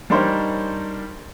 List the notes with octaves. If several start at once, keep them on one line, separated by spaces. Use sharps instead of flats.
G3 D4 D#4 A#4 C5 C#5